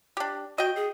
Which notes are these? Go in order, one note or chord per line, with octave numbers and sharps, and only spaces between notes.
D4 G4
F#4 D#5 G5
G#4